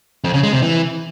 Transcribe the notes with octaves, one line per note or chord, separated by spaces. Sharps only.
F2
C#3
G#3
C3
E3